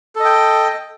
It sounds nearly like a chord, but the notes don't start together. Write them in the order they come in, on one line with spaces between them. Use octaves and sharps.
A4 D#5 G5